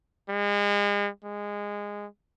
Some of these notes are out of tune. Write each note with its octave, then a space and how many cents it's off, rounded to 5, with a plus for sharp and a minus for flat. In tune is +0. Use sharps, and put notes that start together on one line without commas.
G#3 -35
G#3 -15